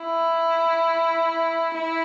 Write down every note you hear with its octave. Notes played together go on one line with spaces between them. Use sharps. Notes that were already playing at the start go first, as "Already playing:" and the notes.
Already playing: E4
E4